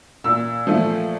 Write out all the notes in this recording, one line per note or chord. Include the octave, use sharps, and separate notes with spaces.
A#2 E6
F3 A3